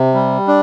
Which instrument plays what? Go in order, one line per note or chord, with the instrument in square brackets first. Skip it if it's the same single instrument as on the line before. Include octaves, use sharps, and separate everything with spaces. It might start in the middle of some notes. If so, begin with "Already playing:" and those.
Already playing: [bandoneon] C3
G3
D4